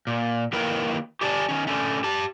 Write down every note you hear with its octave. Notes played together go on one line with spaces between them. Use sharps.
A#2
D#3 A#3 E4 A#4 B4 G5
G4 G#4 D5 G#5 A5
D#3 C#4
D3 A3 C#4
G4 A5